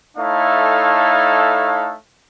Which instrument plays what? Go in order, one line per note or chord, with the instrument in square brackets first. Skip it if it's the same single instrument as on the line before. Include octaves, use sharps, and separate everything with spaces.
[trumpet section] A3 D#4 E4 A4 C#5 F5